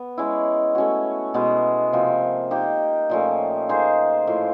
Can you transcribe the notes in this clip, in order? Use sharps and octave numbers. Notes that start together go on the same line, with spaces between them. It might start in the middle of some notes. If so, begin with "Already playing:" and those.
Already playing: B3
G#3 C#4 E4
A3 C#4 F#4
B2 G#3 B3
C3 F3 A#3
A#3 D#4 G4
A#2 F3 A3 C#4
A#3 D#4 G#4 C5
A2 F3 A#3